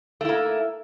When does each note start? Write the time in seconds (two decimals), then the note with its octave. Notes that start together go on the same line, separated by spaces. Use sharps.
0.21 A3
0.25 E4
0.29 A#3